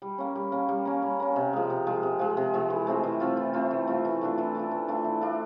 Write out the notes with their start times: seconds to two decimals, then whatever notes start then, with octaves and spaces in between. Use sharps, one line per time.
0.02 G3
0.18 A#3 C#4
0.35 G3
0.52 A#3 C#4
0.69 G3
0.85 A#3 C#4
1.02 G3
1.20 A#3 C#4
1.36 C3
1.53 F3 G#3
1.70 C3
1.87 F3 G#3
2.03 C3
2.19 F3 G#3
2.37 C3
2.54 F3 G#3
2.70 E3
2.87 A3 C4 F4
3.03 E3
3.20 A3 C4 F4
3.37 E3
3.53 A3 C4 F4
3.71 E3
3.87 A3 C4 F4
4.05 E3
4.21 A3 D4 F4
4.38 E3
4.55 A3 D4 F4
4.71 E3
4.88 A3 D4 F4
5.04 E3
5.21 A3 D4 F4